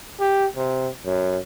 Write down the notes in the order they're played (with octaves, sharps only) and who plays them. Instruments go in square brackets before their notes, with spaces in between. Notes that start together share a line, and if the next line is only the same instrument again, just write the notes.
[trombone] G4
C3
F#2